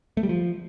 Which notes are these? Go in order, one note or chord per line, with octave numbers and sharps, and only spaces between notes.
A3
G3
F3